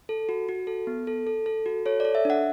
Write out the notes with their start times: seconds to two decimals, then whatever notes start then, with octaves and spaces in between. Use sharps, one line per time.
0.09 A4
0.29 F#4
0.49 F#4
0.67 A4
0.87 B3
1.07 A4
1.27 A4
1.46 A4
1.66 F#4
1.86 A4 C#5
2.00 D5
2.05 A4
2.15 E5
2.25 D4 F#5